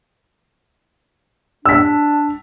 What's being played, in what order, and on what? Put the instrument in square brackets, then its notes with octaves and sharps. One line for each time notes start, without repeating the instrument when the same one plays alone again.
[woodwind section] D4 [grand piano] E6 B6